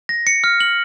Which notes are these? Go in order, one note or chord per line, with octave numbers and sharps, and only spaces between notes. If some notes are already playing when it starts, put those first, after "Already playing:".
A#6
C#7
F6
F#7